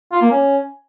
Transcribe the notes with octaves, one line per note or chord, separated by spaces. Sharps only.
F4
A#3
C#4